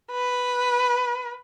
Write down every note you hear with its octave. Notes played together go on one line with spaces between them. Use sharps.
B4